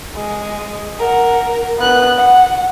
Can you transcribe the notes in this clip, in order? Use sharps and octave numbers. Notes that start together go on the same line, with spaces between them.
G#3
A#4 F#5
B3 F#6
F#5